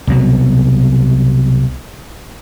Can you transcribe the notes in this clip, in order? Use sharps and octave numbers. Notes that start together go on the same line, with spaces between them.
C2 B2 F#3